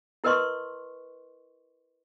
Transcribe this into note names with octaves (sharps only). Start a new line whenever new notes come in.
E4 A#4 B4 D#5 C6 C#6